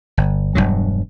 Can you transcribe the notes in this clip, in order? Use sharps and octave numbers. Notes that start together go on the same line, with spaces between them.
G1
E1 C2 G2 F#3